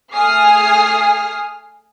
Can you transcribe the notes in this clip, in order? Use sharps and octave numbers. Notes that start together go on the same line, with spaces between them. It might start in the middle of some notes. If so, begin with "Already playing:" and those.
A3 G#4 G#5 D#6 F6 C7